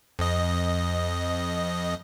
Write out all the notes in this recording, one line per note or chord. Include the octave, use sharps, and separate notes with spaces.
F2 D#5